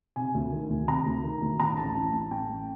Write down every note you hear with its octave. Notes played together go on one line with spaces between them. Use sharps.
C3 G#5
D2
D#3
D2
C3 A#5
D2
D#3
D2
A2 A#5
A1 A5
E3 A5
A1 A5
A2 G5
A1